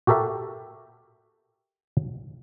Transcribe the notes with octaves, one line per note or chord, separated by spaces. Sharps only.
F#4 G4 A4 A#4 E5